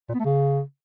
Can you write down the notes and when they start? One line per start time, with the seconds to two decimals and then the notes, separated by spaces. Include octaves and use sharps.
0.09 A#2
0.14 B3
0.19 A3
0.25 C#3